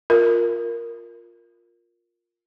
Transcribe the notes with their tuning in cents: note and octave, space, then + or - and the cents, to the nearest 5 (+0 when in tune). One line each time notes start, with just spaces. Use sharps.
F4 +10 A#4 +0